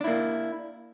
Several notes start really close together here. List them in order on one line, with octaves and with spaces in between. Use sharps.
D4 E4 A#3